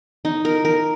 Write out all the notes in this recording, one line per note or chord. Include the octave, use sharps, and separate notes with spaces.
D#4
A#4
A#4